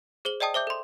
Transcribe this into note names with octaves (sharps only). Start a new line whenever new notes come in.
G#4 C5 F#7 G7
D5 D#5 G5 A5 D#6
C5 E5 D6 G6
A4 C6